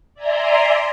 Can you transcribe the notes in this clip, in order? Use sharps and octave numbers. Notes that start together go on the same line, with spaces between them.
D5 E5 G#5 A#5 C6